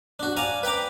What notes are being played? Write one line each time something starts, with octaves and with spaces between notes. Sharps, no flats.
D4 F#4
D5 F5 G#5 A#5
B4 G5 A#5 D6